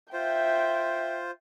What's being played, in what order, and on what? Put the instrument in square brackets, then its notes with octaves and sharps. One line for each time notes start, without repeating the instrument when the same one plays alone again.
[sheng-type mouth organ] F4 C5 [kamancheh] E5 G5